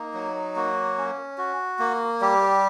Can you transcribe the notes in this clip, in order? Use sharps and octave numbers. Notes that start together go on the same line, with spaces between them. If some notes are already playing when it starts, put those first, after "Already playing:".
Already playing: A#3 D#4
F#3
A#3 F#4
C#4
F#4
A#3
G3 G4